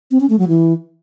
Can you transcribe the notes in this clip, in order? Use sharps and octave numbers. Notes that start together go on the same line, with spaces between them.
C4
C#4
A3
F#3
E3